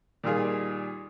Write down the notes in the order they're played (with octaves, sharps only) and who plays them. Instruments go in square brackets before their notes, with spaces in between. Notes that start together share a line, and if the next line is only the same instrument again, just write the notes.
[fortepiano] A#2 D#3 G3 F4 G#4